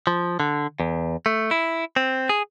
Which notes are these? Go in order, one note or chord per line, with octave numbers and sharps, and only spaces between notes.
F3
D3
E2
A3
E4
C4
G#4